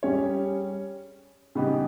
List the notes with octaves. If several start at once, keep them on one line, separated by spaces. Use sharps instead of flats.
G3 C#4 G#4 C#5
C#3 G3 B3 D#4 G4